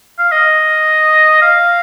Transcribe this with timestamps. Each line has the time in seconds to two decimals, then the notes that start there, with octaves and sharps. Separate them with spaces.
0.18 F5
0.32 D#5
1.42 F5